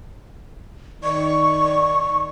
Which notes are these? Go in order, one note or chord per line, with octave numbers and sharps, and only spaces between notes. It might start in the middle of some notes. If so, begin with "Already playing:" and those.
D#3 D5 C#6